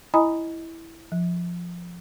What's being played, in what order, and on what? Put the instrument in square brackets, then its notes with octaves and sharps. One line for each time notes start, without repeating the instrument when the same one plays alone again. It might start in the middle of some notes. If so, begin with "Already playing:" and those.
[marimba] E4 D#5 G#5 A#5 B5 D#6
F3